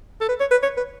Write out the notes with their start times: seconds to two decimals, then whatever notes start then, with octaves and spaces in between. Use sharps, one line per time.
0.21 A4
0.29 B4
0.40 C#5
0.51 B4
0.63 C#5
0.77 B4